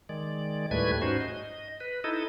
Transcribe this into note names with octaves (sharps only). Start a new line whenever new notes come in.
D#3 G#3 D5
D#2 A2 G3 A3 B4 G#6
G#2 C#4 D#4 F#4 C5
D#5
B4
D#4 E4 A4 D#5